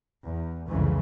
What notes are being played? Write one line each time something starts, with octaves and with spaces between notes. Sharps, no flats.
E2
C2 F2 G#2 C#3 E3